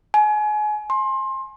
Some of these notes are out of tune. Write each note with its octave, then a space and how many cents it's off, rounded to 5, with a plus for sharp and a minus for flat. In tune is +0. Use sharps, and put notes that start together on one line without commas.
G#5 +30
C6 +25